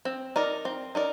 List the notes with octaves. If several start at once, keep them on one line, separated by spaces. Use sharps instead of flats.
C4
D#4 A#4 D5
C4
D#4 A#4 D5